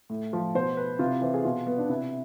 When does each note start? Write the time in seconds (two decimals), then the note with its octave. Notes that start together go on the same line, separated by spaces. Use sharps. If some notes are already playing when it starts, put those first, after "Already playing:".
0.10 A2
0.33 F3
0.55 B2 C5
0.77 B4
0.99 C3 F4
1.11 E4
1.22 E3 C5
1.34 G#4
1.45 B2 F4
1.67 B3
1.78 D4
1.89 C3 E4